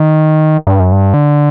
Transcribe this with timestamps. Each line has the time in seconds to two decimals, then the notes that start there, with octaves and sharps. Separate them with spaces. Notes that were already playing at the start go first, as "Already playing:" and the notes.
Already playing: D#3
0.67 G2
0.80 F#2
0.92 G2
1.14 D3